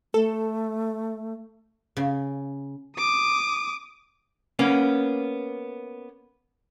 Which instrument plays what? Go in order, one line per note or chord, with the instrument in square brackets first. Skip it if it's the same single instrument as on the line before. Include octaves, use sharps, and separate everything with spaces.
[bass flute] A3 [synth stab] A4
[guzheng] C#3
[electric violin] D6 D#6
[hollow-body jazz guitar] A#3 B3 C#4